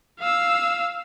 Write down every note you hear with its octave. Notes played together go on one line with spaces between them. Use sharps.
F5 E6